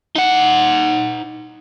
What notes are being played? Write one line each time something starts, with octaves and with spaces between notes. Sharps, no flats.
D#4 F#5